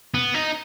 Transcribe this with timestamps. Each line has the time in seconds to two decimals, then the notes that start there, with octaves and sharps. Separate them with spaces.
0.14 B3
0.34 D#4